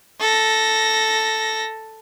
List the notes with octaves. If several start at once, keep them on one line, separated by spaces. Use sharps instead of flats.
A4 A#6